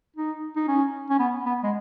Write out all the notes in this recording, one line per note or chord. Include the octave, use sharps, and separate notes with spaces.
D#4
D#4
C#4
C#4
B3
B3
G#3